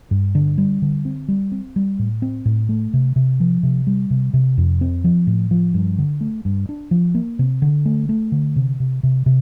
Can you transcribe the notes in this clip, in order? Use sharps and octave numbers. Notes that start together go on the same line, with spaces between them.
G2
D3
G3
D3
C4
G3
C4
G3
A2
C4
A2
A3
C3
C3
F3
C3
G3
C3
C3
F2
C4
F3
A2
F3
G2
D3
A3
G2
D4
F3
A#3
C3
D3
A3
A3
D3
C3
C3
C3
C3